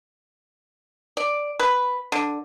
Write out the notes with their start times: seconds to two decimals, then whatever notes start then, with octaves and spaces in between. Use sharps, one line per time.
1.17 D5
1.59 B4
2.12 D3